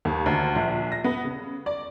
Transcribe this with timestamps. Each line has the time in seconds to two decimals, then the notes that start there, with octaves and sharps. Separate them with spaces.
0.05 D#2
0.26 D2
0.56 A#1
0.92 A#6
1.04 B3
1.25 C#3
1.66 D5